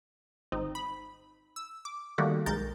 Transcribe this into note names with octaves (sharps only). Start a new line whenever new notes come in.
G#1 C4 D#4
B5
E6
D6
D#3 G3 A3 A#3 F#4 G4
B1 G#2 A#4 G6 A6